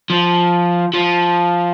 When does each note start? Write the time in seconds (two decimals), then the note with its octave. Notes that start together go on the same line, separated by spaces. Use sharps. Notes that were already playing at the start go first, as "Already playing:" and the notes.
0.10 F3
0.93 F3